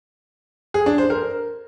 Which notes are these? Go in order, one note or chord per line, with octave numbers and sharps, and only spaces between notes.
G#4
D4
C5
A#4